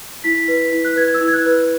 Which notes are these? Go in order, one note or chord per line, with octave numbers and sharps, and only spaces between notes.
E4 B6
B4
E4
F#6
B4 G#6
E6
E4
G#6
F#6
B4